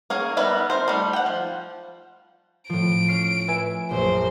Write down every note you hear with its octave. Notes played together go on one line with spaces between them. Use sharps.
A#3 C#4 G#4
G3 B3 A#4 B4 E5
C4 A#4 C5
G3 A3
F#5 G5
F3
A2 F3 D7
C#4 F6 C7
B4 E5 G#5
A#1 F#2 C5